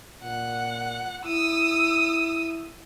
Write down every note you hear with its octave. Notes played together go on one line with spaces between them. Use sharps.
A#2 F#5
E4 D#6 E6